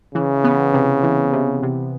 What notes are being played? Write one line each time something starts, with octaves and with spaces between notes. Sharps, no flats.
C#3 E3
B3
C3
E3
C3
C3